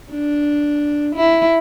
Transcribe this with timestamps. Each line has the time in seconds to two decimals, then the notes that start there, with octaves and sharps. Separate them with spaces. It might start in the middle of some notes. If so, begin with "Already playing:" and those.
0.11 D4
1.15 E4